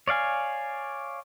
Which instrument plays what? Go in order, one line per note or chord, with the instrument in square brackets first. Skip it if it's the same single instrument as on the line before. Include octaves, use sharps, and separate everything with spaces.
[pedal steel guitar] C#5 D5 F5 G#5